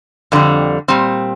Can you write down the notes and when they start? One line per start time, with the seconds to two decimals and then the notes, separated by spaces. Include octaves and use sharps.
0.32 F2 D3 G3
0.88 A#2 G3 C4